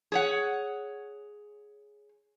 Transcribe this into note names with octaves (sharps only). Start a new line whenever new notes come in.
G#4 C#5 F#5